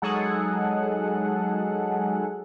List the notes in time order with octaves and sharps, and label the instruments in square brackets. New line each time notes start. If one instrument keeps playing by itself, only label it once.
[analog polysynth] F#3 G#3 D#4 G#4 A4 F#5